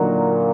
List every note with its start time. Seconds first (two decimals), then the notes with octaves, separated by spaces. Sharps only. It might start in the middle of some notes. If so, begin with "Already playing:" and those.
Already playing: A#2 D3 F#3 A#3 D#4 F#4